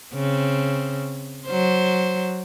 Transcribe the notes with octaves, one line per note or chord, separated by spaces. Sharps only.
C#3 C4
F#3 C5